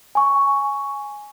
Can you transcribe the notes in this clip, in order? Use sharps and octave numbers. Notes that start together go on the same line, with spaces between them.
G#5 C#6